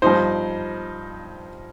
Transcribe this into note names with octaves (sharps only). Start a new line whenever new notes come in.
G2 F3 D#4 C5